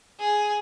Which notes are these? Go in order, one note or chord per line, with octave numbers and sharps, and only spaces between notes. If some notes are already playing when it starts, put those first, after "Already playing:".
G#4